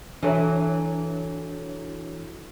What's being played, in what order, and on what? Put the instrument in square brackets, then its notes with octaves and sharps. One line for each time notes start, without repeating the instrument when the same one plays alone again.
[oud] E3 F#3 [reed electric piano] D4 A4 C#5